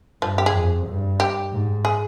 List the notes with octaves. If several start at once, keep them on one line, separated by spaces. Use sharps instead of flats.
G2 F3
G4
G#4
F2
G2
G4
G#2
G#4